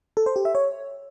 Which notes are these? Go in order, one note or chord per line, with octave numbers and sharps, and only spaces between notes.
A4
C5
G4
E5
C#5